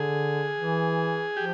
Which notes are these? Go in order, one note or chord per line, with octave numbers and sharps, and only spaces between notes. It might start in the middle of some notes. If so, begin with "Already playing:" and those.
Already playing: D3 G#4
E3
F3 G4